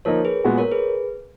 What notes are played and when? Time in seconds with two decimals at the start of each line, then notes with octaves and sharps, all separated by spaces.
0.05 F3 A#3 D#4 A#4 C#5
0.25 G#4 B4
0.44 A#2 G#3 B3 F#4
0.58 A#4 C#5
0.71 G#4 B4